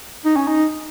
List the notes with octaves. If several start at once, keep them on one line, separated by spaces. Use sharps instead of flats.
D#4
C#4
D#4